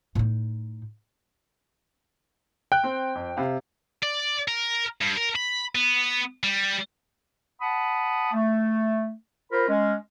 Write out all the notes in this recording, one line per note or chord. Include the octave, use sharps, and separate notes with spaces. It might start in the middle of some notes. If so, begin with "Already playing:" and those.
A2 D#4
G5 F#6
C4
F2
C3 F5
D5
A#4
G2
A#4
B5
B3
G3
F#5 A5 B5 D#6
A3
F4 A#4 C5 B5
G#3 C#4